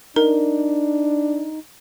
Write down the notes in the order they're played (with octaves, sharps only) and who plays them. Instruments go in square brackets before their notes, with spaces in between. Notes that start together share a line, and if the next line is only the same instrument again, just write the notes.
[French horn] D4 [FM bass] D#4 [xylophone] A#4